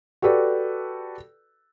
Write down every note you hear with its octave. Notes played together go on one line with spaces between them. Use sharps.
F#4 G4 A4 B4 D5